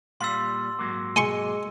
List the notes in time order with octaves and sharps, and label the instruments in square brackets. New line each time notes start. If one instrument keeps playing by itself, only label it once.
[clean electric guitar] A#2 G3 F5 [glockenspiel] C6 E6
[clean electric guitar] G#2 F#3 A#3
[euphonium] G#3 [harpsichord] G#5 C6 C#6